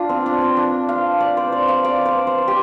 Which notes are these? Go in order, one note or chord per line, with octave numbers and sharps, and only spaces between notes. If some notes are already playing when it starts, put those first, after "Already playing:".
Already playing: D4 F4
C4
D4
C4
D4
F5
D5
C5
D5
F5
D5
C5
C5
G4